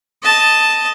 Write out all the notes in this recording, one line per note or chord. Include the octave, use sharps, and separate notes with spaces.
D#5 A5